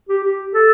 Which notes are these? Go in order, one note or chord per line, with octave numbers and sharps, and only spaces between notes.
G4
G4
A4